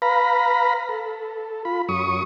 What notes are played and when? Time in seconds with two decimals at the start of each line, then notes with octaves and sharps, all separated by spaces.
0.02 B4 F5 A#5 B5
0.89 A4
1.65 F4 B5
1.89 F#2 C#6 D#6